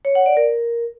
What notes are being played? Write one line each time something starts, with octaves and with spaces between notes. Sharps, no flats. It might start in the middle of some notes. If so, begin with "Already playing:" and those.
C#5
F#5
D5
A#4